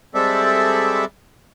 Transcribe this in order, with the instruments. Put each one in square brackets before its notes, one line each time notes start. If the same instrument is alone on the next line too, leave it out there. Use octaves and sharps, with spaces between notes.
[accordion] G3 G#3 C4 A4 D5 E5